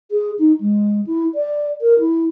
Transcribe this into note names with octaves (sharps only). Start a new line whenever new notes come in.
G#4
D#4
G#3
E4
D5
A#4
E4